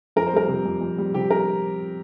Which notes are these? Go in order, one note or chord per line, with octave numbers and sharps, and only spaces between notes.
F2 A#4
C5
G3 A#4
C3
F2
F2
G3
C3 G4
A#4